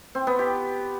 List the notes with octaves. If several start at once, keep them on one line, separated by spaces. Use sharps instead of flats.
C4
B3
G4